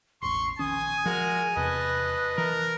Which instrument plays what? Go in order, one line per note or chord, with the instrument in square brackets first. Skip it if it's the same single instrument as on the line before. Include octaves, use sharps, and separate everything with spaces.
[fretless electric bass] E1 A1 [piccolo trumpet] C6 [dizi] C#6
[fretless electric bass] A#1 D#3 C#4 [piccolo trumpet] G#5 [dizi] D#6
[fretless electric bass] F3 [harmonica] G#3 F#4 [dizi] A#4
[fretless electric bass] E2 C3 [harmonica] B4 D#5 A5 [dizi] F#6
[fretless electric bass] E3 [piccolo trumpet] A#4